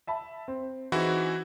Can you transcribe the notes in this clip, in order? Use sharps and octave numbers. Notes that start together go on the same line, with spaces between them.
E5 A5 B5
C4
E3 C4 D#4 E4 F#4 G#4